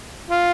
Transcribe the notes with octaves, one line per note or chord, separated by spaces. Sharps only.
F4